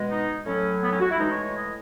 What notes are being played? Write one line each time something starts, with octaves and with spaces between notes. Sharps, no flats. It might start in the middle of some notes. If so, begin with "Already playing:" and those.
Already playing: B2 G#3
D#4
A2 F#3 C#4
B3
C#4
F#4
E4
A2 E3 G#3 D#4
C#5
C#5
D#5